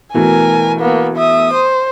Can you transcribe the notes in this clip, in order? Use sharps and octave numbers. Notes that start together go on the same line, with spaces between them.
B2 E3 A3 A#4 G#5
A#3 B3
E5 D#6
C5